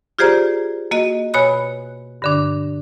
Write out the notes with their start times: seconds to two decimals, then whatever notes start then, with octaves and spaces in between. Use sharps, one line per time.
0.19 F4 G4 G#4 C5 D5 A#5
0.91 A#3 F#4 D#5
1.34 B2 C#5 G#5 B5 F#6
2.22 G2 D3 D4